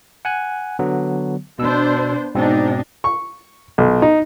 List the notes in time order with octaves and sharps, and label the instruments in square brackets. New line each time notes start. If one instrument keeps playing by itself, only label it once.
[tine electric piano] F#5 G#5 F#6
D3 F#3 B3
[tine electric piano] B2 E6 [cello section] B3 D4 C5
[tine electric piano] G#2 B2 C4 [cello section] D4 D#4
[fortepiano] C#6
B1
D#4